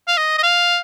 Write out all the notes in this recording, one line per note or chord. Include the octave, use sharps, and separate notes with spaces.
F5
D#5
D#5
F5